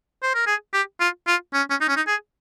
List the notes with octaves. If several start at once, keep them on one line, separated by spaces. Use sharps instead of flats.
C5
A#4
G#4
G4
F4
F4
C#4
C#4
D#4
C#4
D#4
G#4